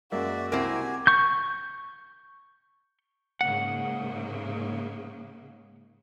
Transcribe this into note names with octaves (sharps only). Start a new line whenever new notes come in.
F#2 G#3 A#3 F#4 D5 E5
C2 C4 E4 G4 A#4 G#5
C#6 G6
G#2 C#3 A#3 F#5